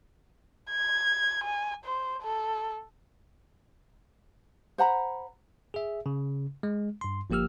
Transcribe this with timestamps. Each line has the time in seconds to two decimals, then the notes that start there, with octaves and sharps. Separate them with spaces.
0.71 G#6
1.44 G#5
1.85 C5
2.22 A4
4.78 C5 F#5 A#5 B5
5.74 G#4 E5
6.06 C#3
6.63 G#3
7.01 G2 C6
7.30 G1 F3 A#3 G4 E6 F6